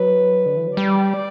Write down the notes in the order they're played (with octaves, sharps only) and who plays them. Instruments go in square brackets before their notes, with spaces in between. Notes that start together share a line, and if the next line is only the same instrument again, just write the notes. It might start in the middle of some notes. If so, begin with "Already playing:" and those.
Already playing: [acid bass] F#3 [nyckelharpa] B4
[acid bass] D3
E3
F#3
[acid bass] G3 [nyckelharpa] D5